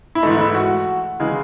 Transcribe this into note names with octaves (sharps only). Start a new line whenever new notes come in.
E4
G#2 E3 A3 D#4
E4
F#4
C#3 E3 G#3